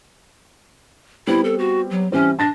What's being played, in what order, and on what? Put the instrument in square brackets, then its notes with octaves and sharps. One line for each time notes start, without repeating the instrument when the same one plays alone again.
[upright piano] G3 B3 C4 [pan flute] E4
[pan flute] A4
F#4
F#3
[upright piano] E3 G3 C4 [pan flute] C#4
[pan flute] D4 [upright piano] A5 A6 A#6